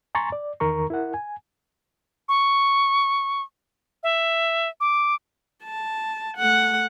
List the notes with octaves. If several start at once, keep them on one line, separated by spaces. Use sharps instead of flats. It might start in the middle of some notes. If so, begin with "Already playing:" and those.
G#5 A#5 C6 C#6 A6
D5
E2 D#3 A#4 A#5 C#6
E4 A#4 F#5
G#5
C#6
E5
D6
A5
A3 F#5